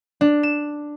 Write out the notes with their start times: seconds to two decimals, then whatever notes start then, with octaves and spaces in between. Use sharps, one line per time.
0.21 D4
0.43 E7